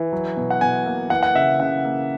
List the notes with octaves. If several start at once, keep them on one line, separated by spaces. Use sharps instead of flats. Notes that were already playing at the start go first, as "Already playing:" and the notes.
Already playing: E3
F#3
B2
F#5
B2 G#5
A#3
E3 F#5
F#5
C#3 E5
C#3 F#5
A#3